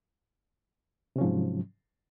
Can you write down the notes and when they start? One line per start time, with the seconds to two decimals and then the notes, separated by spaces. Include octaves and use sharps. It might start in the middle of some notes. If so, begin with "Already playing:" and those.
1.16 C3
1.18 C#4
1.21 F3
1.24 G#2
1.26 F#3